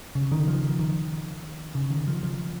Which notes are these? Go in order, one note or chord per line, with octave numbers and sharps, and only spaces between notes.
C#3
D#3
F3
D#3
C#3
D#3
F3
F3